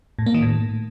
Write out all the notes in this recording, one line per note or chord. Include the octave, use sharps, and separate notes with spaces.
A2
A#3
D#3
A2